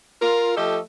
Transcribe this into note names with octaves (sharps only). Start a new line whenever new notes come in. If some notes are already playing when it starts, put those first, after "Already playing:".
F4 A#4
F3 A3 G4 A4 D#5